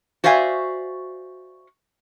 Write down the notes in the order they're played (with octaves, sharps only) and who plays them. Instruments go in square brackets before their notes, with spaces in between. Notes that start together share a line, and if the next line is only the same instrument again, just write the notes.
[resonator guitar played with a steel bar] F#4 C5 D5 E5 F5 G#5